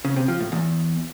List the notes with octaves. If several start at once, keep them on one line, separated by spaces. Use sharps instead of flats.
C#3
C3
F3
A2
E2